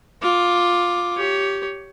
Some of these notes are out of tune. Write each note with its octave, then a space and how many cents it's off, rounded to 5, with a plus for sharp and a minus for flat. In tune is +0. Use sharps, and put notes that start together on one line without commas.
F4 +10 D6 +0
G4 -5 C#5 +15